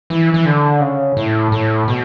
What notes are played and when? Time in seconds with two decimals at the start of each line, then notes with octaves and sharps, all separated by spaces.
0.10 E3
0.34 E3
0.45 D3
0.80 C#3
1.17 A2
1.52 A2
1.88 B2